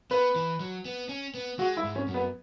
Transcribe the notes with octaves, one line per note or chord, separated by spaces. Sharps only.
B3 B4
E3
F#3
B3
C#4
B3
G#3 F#4
E4
G#2
C#4
F#2
B3